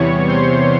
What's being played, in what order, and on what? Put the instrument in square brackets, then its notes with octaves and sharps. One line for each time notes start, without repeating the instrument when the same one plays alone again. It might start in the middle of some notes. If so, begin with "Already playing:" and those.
Already playing: [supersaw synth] E2 C3 E3 G3 B3 C#5 C#6
C5 C6